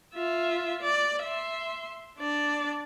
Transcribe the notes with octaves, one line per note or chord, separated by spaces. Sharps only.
F4 E5
D5
E5 C6
D4 D5